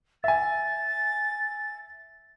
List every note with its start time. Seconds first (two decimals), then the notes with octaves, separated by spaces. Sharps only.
0.24 E5 G#5 A6